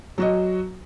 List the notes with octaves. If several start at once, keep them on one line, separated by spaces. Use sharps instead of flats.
F#3 F#4 D#5